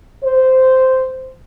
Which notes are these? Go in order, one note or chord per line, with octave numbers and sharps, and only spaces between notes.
C5